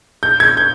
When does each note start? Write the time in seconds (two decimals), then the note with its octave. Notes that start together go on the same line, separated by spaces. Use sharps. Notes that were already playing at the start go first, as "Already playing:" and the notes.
0.23 G6
0.40 G#6
0.57 G6